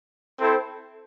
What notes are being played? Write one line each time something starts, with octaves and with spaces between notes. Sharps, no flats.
C4 E4 A4 C5